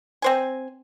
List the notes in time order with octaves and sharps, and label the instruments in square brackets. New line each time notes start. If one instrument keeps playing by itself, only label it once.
[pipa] C4 C5 G#5